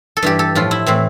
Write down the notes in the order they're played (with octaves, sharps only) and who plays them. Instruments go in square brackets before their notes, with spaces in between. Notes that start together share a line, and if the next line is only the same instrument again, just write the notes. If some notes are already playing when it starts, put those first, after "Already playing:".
[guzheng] A4
G2 E3 G4
A4
A2 F3 F4
E4
A2 E3 C4